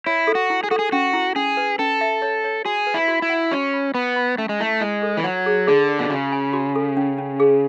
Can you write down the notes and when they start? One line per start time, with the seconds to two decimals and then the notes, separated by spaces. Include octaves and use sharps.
0.06 E4 C#5
0.27 A4
0.35 F#4
0.50 E4
0.64 G#4
0.71 F#4 A4
0.79 G#4
0.92 C#4 F#4
1.14 E4
1.36 C#4 G#4
1.57 B4
1.79 C#4 A4
2.01 E5
2.22 C#5
2.44 C#5
2.65 F#4 G#4
2.87 B4
2.94 E4
3.08 F#4
3.22 E4
3.30 F#5
3.52 C#4 F#4
3.73 B5
3.94 B3 B5
4.16 B5
4.37 A3 C#4
4.49 G#3
4.60 A3 E4
4.81 G#3 E4
5.02 A4
5.17 E3
5.24 F#3 F#5
5.46 G#4
5.67 D3 G#4
5.89 D5
5.99 B2
6.10 C#3 F#4
6.32 G#5
6.53 F#4
6.76 A4
6.97 C#4
7.18 C#4
7.40 G#4